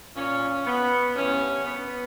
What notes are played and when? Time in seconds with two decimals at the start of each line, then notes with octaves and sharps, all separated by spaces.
0.15 A#2 C#4
0.66 B3
1.15 G2 E3 C#4
1.65 B3